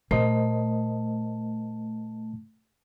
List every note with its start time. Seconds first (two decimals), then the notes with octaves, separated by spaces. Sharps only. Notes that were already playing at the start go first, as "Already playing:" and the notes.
0.11 A#2 A3 A#4 C5 D#5